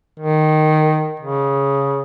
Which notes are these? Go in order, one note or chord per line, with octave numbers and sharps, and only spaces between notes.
D#3
C#3